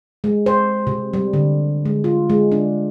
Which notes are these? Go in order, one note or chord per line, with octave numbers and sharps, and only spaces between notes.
G#3
C5
C3
G3
D3
G#3
F4
G#3
D4